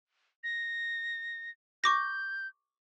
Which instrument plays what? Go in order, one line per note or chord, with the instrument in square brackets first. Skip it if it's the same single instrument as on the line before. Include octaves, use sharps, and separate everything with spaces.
[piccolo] A#6
[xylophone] C#6 D6 A#6 [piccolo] G6